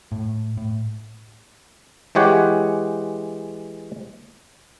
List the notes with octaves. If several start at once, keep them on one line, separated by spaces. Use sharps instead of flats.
A2
A2
E3 G#3 G4 C#5 F#5